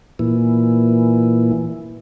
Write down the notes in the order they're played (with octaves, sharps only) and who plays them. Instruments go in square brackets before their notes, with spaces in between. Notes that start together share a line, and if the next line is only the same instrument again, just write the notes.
[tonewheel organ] A#2 E3